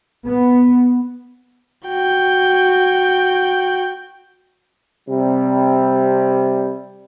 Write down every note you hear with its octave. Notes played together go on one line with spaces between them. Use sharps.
B3
F#4 G5
C3 G3